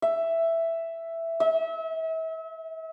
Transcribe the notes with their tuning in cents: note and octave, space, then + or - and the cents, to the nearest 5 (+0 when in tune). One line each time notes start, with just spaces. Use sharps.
E5 +5
E5 -35